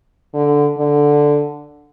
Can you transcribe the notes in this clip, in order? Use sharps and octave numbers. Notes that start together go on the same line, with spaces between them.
D3
D3